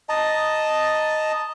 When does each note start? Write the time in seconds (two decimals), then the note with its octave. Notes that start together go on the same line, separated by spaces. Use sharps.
0.09 D#5 A5 A#5